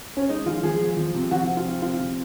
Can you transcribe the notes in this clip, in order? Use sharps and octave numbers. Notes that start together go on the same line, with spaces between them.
C#4
G#3 D#4
F3 F4
F3 G#4
F3
F3
C3
F3 F#4
C4
F4
C4
C4 F4
C3